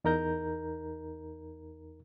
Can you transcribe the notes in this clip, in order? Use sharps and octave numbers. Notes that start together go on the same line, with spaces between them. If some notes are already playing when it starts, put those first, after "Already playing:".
E2 D#4 A#4 A#5 G6